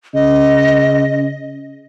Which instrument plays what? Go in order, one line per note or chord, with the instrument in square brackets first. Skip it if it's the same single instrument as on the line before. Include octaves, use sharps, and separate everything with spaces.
[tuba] C#3 [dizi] D#5